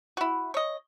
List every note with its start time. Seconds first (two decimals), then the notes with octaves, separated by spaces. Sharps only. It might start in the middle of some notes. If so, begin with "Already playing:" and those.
0.17 E4 F#4
0.54 C#5 D#5